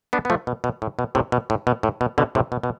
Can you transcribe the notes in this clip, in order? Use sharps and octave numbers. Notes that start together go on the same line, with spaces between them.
B3 D4
B3
F3 A3
B2
B2
A2
B2
A2 C3
B2
A2
B2
A2
B2
B2 D3
A2 C3
B2
B2